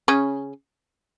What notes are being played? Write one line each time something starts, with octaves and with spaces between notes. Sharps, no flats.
C#3 C#4